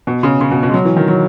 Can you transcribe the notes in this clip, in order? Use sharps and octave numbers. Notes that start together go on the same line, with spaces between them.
B2
C#3
C#3
B2
B2
G#3
F#3
E3
D#3
F#3